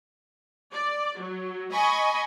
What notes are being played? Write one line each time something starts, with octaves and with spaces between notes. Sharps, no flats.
D5
F#3
D#5 G#5 B5 C#6